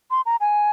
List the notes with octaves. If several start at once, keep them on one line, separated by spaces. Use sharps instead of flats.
C6
A#5
G#5